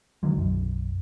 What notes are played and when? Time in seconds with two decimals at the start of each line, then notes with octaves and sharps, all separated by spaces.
0.23 D3 D#3 F#3 G#3
0.36 B1 F#2